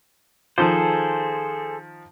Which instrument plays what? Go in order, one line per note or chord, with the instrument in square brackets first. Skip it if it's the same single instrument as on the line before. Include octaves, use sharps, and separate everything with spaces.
[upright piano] D#3 F3 [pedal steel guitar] G#4 A4 C5